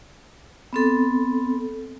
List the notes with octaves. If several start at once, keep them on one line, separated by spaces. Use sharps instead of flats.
B3 C4 A4